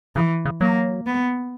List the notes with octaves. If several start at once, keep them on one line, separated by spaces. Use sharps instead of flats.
C#3 E3
C#3
F#3 A#3
B3